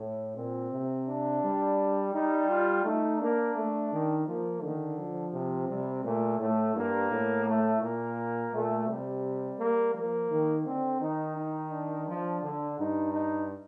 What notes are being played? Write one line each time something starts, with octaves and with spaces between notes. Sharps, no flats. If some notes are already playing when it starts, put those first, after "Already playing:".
Already playing: A2
A#2 C4
C3
D4
G3
G3 D#4
F4
A3 D#4
A#3 D4
A3
D#3
F3 A#3
D3 D#3
F3
C3
C3 G3
A#2 A3
A2 A3
G2 A#3
A2
A3
A#2 A#3
A#2 A3
C3 G3
A#3
F3 A#3
D#3
D3 C4
D#3 D#4
D#4
D4
F3
D3
G2 D#4
D#4